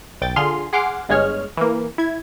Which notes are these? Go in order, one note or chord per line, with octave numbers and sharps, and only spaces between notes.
B1 G5 A6
D3 F4 G#4 C6 F6
G#4 F#5 C6 D6 F6
G1 G2 G#3 G#4 C#5 F6
E3 A#3
E4 G#6